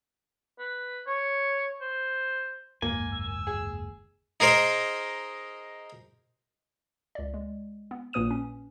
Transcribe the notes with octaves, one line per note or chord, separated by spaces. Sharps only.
B4
C#5
C5
F#1 D#2 G#2 A#3 G#5
E6
G#4
D#4 G#4 A#4 C5 D#5
C#2 D5
G#3
B3
A#1 A#2 A#3 B4 D#6 D#7
C#4